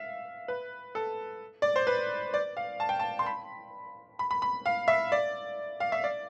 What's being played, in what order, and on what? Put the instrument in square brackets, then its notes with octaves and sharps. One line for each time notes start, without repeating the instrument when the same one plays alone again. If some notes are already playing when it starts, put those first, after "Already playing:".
Already playing: [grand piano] E5 F5
B4
A4
D5
C5
B4
D5
F5
A5
G5
A5
C6
B5
B5
B5
B5
F5
E5
D5
F5
E5
D5